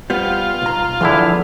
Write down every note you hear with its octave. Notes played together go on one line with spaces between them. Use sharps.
G3 B3 F4 C5
B1 A#5
E2 D3 F3 E4